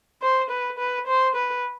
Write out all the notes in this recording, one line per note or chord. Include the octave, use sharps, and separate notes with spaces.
C5
B4
B4
C5
B4